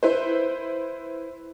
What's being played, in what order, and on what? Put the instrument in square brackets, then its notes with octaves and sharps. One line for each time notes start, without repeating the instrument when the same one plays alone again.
[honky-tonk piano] E4 B4 C5